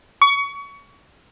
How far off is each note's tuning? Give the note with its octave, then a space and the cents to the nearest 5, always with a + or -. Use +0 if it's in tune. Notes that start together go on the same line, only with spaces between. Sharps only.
C#6 +25